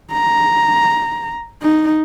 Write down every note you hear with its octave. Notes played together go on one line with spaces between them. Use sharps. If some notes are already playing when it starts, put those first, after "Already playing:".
A#5
D#4